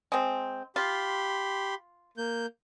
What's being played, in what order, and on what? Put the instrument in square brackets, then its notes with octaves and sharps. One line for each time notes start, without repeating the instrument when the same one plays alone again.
[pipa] G#3 C4
[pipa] F4 [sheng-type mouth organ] G4 B5 C6
[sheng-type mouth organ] A#3 G6